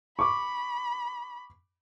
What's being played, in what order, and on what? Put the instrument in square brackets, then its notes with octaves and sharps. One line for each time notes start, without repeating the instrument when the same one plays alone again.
[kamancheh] B5 [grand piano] C#6 D6